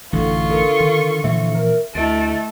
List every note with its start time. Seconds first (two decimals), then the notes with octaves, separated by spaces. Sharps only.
0.13 A1 F#2 D3 F4 C#6
0.51 A4 A#4
0.80 D#3
1.24 A#2 E3 F3 E5
1.54 A#4
1.95 D2 A3 E4 D#5 A6 D7